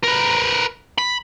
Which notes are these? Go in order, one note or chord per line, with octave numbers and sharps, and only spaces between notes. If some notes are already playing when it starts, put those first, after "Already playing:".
A#4 B4
B5